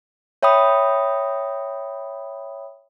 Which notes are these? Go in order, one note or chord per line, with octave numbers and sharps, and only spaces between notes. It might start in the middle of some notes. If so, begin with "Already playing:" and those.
C#5 E5 G5 B5 D#6